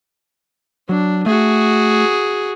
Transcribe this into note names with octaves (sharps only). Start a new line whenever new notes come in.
F#3 D4
A3 F#4 G#4